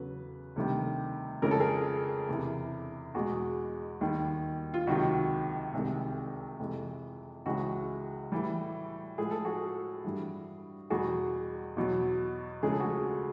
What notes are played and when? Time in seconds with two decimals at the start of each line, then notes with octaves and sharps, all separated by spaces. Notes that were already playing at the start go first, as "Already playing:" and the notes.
Already playing: E2 C#3 F#3 A4 B4
0.56 D2 C3 D#3 G3
1.42 F2 C#3 F3 G#3 A#4
1.51 A4
1.60 G#4 A#4
2.29 E2 C3 E3
3.15 E2 B2 G#3 F#4 G#4
4.01 D#2 D#3 G3
4.74 F4
4.87 C#2 C3 D#3 F#3 F#4
5.73 C2 C3 D#3 G#3
6.60 F2 C3 E3 G#3
7.46 C#2 C#3 E3 G#3 F#4
8.32 A2 E3 G3
9.18 A2 F3 G#3 G#4
9.31 A4
9.45 F#4 G#4
10.04 G2 E3 G3
10.90 E2 B2 G3 F#4 G#4
11.77 E2 B2 F#3
12.63 D2 C#3 F3 G#3 G#4
12.71 A4
12.79 F#4 G#4